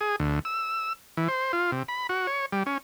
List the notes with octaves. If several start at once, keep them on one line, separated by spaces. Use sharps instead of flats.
G#4
D2
E6
E3
C5
F4
C3
B5
F#4
C#5
G3
C#4